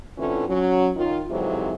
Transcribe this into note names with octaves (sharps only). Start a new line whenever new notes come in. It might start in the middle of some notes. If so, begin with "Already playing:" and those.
A2 D3 E3 C4 C#4 F4
F#3 C#4
D#3 F4
F2 G#2 C3 E3 F#3 C4